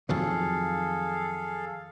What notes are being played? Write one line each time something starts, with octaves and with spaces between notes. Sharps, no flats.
F2 D#3 F#3 G#4 A4 F5